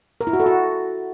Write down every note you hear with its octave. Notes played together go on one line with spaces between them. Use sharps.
A#4
E4
F#4
A4
F#4